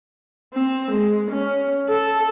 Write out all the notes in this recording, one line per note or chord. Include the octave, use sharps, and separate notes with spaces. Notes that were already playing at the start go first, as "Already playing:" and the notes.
C4
G#3
C#4
A4